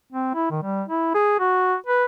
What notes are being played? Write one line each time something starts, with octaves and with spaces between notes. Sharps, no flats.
C4
E4
D#3
G3
E4
G#4
F#4
B4